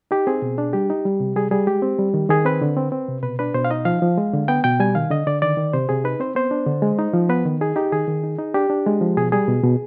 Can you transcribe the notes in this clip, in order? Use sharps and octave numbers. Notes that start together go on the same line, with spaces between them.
D#4 G4
C4 G#4
B2
D4
G3 G4
D#4
G3
C3
G3 G#4
G3 G#4
G#3 G4
C4
G3
D#3
D#3 G#4
C4 B4
D3
C4
C4
C3
B2 B4
D4 B4
B2 C5
F5
D#4 D#5
F3 F5
F3
G#3
D3
B3 G5
B2 G5
G3 G#5
D#3 F5
D3 D#5
D3 D5
D#3 D5
D#3
C3 C5
C3 G#4
D#4 B4
C4 C5
B3 C5
D4
D3
G#3
D#4
F3
B3 B4
D#3
D#4 G#4
D#4 G4
D#3 G#4
D#3
D#4
D#4
D4 G4
D4
G#3
F3
B2 G#4
G3 G#4
B2
B2